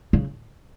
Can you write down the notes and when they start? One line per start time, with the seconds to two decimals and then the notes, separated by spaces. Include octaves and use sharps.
0.13 C#3